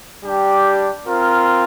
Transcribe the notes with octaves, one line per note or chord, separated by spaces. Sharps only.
G3 D4 G4
C4 F4 A#4